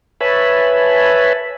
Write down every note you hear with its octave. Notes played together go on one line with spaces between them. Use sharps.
B4 C#5 E5 G#5 A5 B5